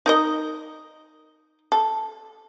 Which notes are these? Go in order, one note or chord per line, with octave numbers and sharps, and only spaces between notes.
D#4 A#4 D#5
A4